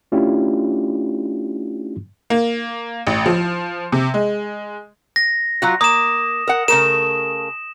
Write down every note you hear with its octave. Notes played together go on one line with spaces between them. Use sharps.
A3 C#4 D4 E4 F4 G4
A#3
A1
F3
C3
G#3
A#6
F#3 F4 F#4
A#3 D#6 E7
A#4 F#5
C#3 A3 A#4 E7